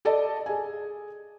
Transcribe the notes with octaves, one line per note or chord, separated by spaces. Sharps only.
A4 D5 D#5 A5
G#4 G#5